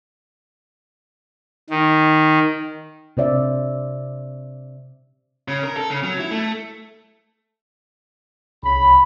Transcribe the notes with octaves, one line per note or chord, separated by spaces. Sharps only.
D#3
C3 C5 D5 E5
C#3
A#4
A4
C#3
F#3
E4
A3
C2 C#3 B5